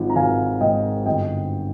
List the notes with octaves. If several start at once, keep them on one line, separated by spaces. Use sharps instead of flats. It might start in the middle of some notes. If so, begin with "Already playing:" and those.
Already playing: G#1 F3
A#5
G#1 F5 G#5
G#2 D#5 G5
G1 D#5 G5